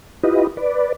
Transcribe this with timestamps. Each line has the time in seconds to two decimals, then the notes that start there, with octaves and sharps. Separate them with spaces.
0.23 E4 F4 G4 B4 D#5
0.57 B4 D5